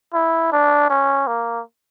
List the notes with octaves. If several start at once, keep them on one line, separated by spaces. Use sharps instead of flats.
E4
D4
C#4
A#3